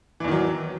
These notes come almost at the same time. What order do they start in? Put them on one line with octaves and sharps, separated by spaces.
E3 E2 D#3 F#3